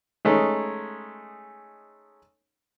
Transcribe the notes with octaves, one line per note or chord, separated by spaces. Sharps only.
G#3 A3 C#4 D#4